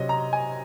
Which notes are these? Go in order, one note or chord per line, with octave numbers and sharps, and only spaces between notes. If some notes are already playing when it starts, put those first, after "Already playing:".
Already playing: C3 F#3 C#4 D#5
A#5
G#5